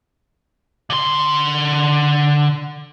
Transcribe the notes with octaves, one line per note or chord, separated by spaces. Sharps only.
D3 C6